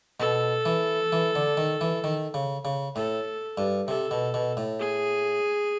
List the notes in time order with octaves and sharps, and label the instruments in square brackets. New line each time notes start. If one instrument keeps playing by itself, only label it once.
[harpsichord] B2 [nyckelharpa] A4
[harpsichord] E3
E3
D3
D#3
E3
D#3
C#3
C#3
[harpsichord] A2 [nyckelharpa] A4
[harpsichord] G2
[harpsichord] C3 [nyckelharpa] A4
[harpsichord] B2
B2
A2
[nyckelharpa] G#4